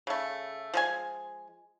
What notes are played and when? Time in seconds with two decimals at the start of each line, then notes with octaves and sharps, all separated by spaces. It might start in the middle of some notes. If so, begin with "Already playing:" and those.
0.07 C#3 A3
0.74 F3 G#3 G#5